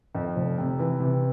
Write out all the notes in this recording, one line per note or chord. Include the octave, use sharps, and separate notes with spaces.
F2
F1
C3
E3
C3